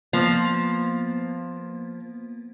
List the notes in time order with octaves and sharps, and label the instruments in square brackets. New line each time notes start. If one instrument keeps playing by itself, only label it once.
[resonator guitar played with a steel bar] F3 [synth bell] A#3 B3